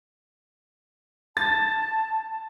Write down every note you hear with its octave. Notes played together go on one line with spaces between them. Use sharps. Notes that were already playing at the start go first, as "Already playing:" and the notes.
A5 A6